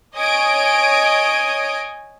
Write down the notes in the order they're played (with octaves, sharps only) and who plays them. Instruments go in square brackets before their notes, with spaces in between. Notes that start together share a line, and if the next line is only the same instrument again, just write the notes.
[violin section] C#5 D#5 G#5 D#6 D7